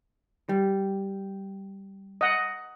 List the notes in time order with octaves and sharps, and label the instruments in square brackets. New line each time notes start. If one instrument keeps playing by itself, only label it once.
[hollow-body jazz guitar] G3
[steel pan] D#5 F#5